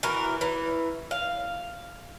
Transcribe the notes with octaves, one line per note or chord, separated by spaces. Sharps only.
E3 F#4 A#4
E3
F5